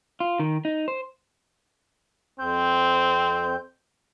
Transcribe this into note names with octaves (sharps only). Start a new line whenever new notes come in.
F4
D#3
D#4
C5
F2 C4 G6